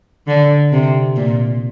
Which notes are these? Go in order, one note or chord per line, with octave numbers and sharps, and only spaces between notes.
D3
C3
A#2